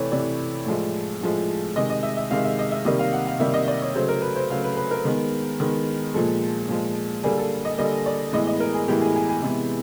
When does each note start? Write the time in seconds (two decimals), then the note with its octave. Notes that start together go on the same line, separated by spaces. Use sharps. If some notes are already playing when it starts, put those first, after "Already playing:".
Already playing: C3 E3 A3 B4 C#5 D5
0.12 C3 E3 A3 D5
0.66 A2 F3 G#3
1.21 A2 F3 G#3
1.76 C3 D#3 G#3 D#5
1.90 D#5
2.03 E5
2.17 E5
2.31 C3 D#3 G#3 F5
2.44 E5
2.59 D#5
2.71 E5
2.85 C3 D#3 G3 A#3 D#5
2.99 F5
3.13 F#5
3.27 F5
3.40 C3 D#3 G3 A#3 E5
3.54 D#5
3.68 D5
3.82 C#5
3.95 C#3 F#3 A3 C5
4.08 A#4
4.22 B4
4.36 C5
4.50 C#3 F#3 A3 F5
4.64 B4
4.77 B4
4.91 A#4
5.05 D#3 G#3 B3
5.60 D#3 G#3 B3
6.14 A#2 F3 G#3 A4
6.68 A#2 F3 G#3
7.24 D3 G3 A#3 G#4
7.38 A4
7.65 D#5
7.78 D3 G3 A#3 D#5
8.06 D5
8.33 A2 E3 G#3 B3 D#5
8.47 D#5
8.60 A#4
8.75 G#4
8.88 A2 E3 G#3 B3 G4
9.01 G#4
9.16 G#4
9.29 G#4
9.43 C3 E3 G#3 B3